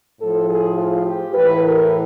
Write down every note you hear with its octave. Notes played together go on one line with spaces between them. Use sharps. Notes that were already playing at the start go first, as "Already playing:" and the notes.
A2 F3 A4
G#4
F4
G4
A2 E3 B4
A#4